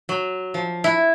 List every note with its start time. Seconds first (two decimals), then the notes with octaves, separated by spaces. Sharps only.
0.09 F#3
0.54 F3
0.84 E4